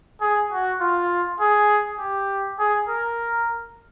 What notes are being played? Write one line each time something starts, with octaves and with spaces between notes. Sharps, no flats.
G#4
F#4
F4
G#4
G4
G#4
A#4